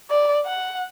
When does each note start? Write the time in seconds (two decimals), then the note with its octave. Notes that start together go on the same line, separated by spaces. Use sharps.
0.10 D5
0.45 F#5